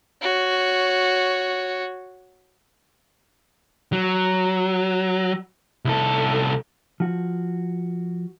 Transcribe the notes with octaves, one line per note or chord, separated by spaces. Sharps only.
F#4 C#5
F#3
C2 A4
F3 F#4